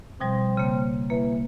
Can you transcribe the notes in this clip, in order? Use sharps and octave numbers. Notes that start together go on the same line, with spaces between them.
B2 F3 G3 C4
C#3 A#3
E3 A#3